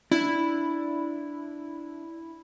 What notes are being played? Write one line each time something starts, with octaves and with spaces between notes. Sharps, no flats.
D4 E4